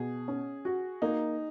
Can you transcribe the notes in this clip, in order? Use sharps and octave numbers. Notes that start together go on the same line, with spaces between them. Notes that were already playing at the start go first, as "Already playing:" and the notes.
Already playing: B2 G#4
C#4
F#4
A#3 D#4